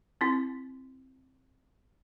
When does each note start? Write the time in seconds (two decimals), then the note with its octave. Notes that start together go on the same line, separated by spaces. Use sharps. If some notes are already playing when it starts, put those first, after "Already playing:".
0.21 C4 E4